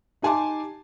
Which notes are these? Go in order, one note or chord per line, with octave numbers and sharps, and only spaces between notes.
D#4 G4 G#5 A5 C6 D6